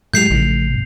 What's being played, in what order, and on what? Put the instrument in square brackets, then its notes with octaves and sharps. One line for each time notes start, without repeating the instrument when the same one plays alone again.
[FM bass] A2 [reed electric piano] F#3 G#3 G4 [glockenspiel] G6 C7 F7
[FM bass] A1 [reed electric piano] C#3 F3 A3
[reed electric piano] G2 B2